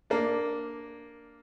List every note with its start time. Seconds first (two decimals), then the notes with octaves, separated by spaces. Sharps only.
0.10 A#3 D4